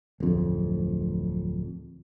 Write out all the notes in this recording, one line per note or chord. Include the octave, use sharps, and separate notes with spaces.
D1 F2